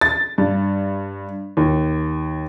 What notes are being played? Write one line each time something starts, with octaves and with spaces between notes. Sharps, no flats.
A6
G2
D#2